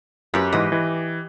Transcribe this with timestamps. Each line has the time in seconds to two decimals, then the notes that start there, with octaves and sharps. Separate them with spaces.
0.34 F#2 G4 B4
0.53 G#2 E3 D#5
0.72 E3